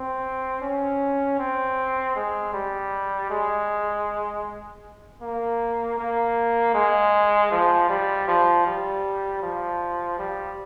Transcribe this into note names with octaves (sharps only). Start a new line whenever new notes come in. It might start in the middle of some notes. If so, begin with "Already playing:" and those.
Already playing: C4
C#4
C4
G#3
G3
G#3
A#3
A#3
G#3
F3
G3
F3
G3
F3
G3